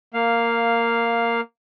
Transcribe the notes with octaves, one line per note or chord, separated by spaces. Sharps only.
A#3 F5